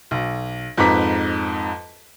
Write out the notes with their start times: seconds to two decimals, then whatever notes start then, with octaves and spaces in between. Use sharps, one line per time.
0.11 B1
0.77 F2 G#2 B4 A#5 D6 B6